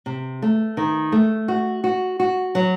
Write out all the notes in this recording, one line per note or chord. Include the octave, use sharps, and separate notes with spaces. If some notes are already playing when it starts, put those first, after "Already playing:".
C3
A3
D#3
A3
F#4
F#4
F#4
F#3